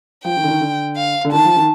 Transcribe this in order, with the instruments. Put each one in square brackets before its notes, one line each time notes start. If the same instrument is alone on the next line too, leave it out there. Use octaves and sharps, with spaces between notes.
[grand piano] F3 [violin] G5
[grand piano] D#3
D3
D#3
D3
[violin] F5
[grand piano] D3
[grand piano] D#3 [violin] A5
[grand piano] F3
D#3